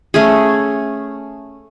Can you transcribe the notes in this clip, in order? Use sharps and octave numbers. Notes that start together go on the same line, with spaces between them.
A3 C#4 G#4